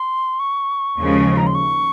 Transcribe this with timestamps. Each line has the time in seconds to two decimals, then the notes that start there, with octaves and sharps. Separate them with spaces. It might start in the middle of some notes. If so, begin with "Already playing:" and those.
Already playing: C6
0.40 C#6
0.98 D#2 C#3 F3 G#3
1.37 A#5
1.47 C6
1.55 C#6